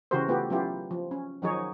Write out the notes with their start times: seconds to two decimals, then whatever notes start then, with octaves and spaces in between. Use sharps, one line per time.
0.11 C#3 E3 F#4 G4 A#4 C5
0.28 A3 B3 F4 G4 A4
0.50 F#3 B3 C#4 E4 F4 G4
0.91 F3
1.11 C#4
1.42 D#3 F3 F#3 D#4 G#4 C#5